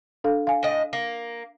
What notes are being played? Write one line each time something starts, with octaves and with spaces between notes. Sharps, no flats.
D4 A4 F5
F5 G#5
A2 D#5
A#3